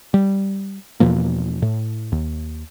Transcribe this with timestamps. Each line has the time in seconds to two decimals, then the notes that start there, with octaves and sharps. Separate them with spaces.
0.14 G3
1.00 E2 B2 F3 A#3
1.62 A2
2.12 D#2